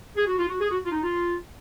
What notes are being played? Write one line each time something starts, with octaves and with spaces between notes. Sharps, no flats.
G#4
F#4
F4
F#4
G#4
F#4
F4
D#4
F4